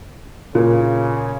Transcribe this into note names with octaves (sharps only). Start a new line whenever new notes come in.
A#2 C#3